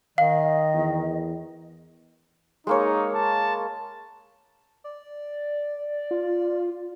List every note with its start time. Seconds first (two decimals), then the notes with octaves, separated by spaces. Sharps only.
0.18 D#3 D#5 F5
0.74 E2
2.67 G#3 A#3 D#4 C#5
3.14 A5
4.84 D5
6.11 F4